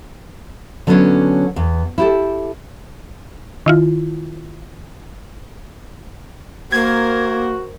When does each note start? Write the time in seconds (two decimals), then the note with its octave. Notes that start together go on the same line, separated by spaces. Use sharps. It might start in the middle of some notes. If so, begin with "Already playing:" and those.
0.87 D3 F#3 A#3 B3 C#4 D4
1.56 E2
1.98 E4 G4 A4
3.66 D#3 E4 F4
6.72 A#3 F#4 A#4 C5 G#6